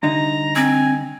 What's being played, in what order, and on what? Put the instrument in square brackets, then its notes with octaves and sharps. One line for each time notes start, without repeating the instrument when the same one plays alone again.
[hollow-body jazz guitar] C2 D3 D#4 [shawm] A#5
[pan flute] C4 [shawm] G#5